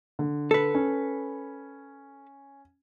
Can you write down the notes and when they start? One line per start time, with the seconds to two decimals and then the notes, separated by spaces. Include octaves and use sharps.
0.19 D3
0.51 A4 B4
0.75 C#4